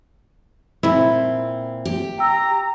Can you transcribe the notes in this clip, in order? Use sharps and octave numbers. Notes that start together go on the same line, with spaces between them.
A#2 C4 E4
G4
G5 A#5 E6